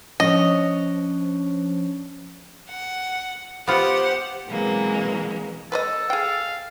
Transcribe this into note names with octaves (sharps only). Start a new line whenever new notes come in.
F3 C#4 D4 C#5 D#5
F#5
B3 F4 G4 C5 F#5
B2 E3 F#3 G#3 A#3 C4
A4 B4 C5 D#5
G#4 F5 G5